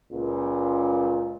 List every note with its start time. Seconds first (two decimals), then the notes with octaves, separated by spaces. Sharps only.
0.12 C#2 A#2